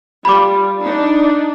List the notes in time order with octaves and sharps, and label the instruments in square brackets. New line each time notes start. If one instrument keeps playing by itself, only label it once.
[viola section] G3 F4 [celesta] B5 D6
[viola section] D4 D#4